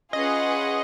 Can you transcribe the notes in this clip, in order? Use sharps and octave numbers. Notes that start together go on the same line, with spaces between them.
C#4 F4 G#4 B4 D#5 F#5